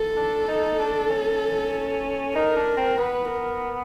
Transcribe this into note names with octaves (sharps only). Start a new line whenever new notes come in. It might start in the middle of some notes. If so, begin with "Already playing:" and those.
Already playing: A4
D4
D#4
D4
C#4
D#4 A#4
D4
C4
B3 B4
A#4